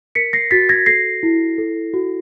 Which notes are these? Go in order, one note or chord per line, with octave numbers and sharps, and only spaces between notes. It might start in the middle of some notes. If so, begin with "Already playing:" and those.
A#4 B6 C#7
A#6 C7
F#4 A6 B6
G#6 A#6
A4 A#6 C7
E4
A4
F#4